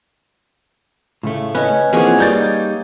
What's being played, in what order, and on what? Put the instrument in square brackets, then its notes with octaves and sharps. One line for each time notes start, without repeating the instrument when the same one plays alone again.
[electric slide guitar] A2 A3 [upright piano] C#3
[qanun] C#4 [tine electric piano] B4 D#5
[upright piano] E3 F3 A#3 [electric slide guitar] C4 F#4 [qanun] C#4 G#4 C#5
[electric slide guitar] G3 D#4 [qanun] A#3 [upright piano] D5 G6 A6